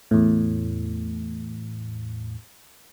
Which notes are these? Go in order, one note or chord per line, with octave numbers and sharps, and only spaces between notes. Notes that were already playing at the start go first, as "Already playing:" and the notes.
E2 A2